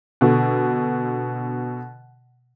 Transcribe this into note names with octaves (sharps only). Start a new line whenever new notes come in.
B2 D3